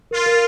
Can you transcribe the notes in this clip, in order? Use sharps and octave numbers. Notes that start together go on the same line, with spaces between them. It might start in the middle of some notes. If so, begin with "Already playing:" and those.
F4 A#4
A#4